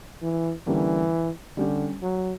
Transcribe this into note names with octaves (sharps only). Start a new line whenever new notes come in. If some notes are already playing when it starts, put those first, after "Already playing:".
E3
D3 E3 G3 A#3 C#4
D3 G3 C#4 G4
F#3